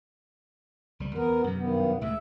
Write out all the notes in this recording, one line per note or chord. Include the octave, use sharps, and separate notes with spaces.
C#2 G3
E2 B3 A#4
F#2 C3
G2 D#3 B3
C#2 A2 C#3 E5